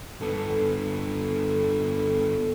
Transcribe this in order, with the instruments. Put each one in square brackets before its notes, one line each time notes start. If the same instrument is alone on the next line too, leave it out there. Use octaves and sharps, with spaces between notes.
[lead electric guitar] G2 B3 [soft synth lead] A4